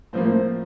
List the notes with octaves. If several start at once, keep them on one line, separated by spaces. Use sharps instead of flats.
A2 F3 A#3 C5